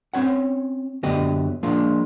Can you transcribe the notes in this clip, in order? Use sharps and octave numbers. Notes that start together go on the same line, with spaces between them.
C4 C#4 C#5 F#5
F#2 D3 B3 G4 D#5
F3 G#3 A#3 D4 F4